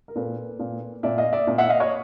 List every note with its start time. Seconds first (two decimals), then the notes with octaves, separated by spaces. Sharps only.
0.08 A#4
0.16 A#2 A4 B4
0.59 A#2
1.03 A#2 D5 E5
1.18 D#5 F5
1.33 D5 E5
1.47 A#2
1.58 E5 F#5
1.69 D#5 F5
1.80 C#5 D#5